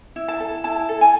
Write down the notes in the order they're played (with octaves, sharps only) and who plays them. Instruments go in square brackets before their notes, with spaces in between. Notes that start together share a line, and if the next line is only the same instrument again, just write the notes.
[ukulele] E4
A5
A4
E4 A5
A4
G#5